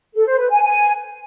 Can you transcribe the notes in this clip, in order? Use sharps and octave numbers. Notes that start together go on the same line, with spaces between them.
A4
C5
B4
G#5
G#5